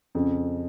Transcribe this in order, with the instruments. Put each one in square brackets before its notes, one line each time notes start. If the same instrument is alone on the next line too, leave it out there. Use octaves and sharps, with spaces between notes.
[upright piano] F2 C#3